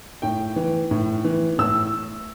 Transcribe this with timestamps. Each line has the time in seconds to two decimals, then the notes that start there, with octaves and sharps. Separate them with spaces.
0.22 A2 G5
0.56 E3
0.91 A2
1.24 E3
1.58 A2 E6